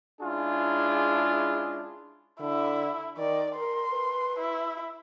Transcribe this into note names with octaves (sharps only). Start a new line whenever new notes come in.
G#3 C#4 D4 E4 F4 G#4
D3 E4
D#3 D5
A#4 C6
B4
E4